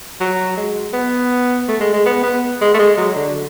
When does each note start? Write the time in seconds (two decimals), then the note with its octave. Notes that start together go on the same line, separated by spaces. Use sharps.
0.20 F#3
0.57 G#3
0.93 B3
1.68 A3
1.80 G#3
1.93 G#3
2.06 B3
2.24 B3
2.61 G#3
2.74 A3
2.79 G#3
2.98 F#3
3.16 D3